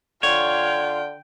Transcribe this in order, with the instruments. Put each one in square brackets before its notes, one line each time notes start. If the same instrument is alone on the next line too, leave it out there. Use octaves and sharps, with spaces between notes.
[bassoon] D3 [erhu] F4 [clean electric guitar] C#5 [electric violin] G5